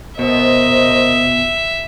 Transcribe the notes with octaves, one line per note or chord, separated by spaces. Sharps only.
B2 A#4 C5 D#5 E5